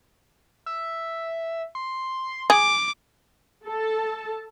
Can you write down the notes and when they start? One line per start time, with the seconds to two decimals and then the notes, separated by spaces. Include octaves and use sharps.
0.66 E5
1.75 C6
2.50 G#4 D6
3.64 A4 A5